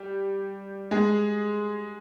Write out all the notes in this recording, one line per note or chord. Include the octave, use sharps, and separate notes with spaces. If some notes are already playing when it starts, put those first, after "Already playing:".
Already playing: G3 G4
G#3 G#4